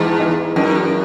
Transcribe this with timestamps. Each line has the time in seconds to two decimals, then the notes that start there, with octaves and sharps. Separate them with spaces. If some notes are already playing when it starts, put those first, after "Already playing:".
Already playing: E2 E3 G#3 D#4
0.19 E3 G#3 D#4
0.56 F#2 E3 G#3 D#4